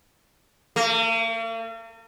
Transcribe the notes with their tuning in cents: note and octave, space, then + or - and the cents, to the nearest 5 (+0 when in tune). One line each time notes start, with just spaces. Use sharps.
A#3 -45